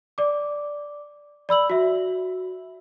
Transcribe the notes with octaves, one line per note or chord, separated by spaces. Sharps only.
D5 D6
D5 B5 E6 F#7
F#4 E5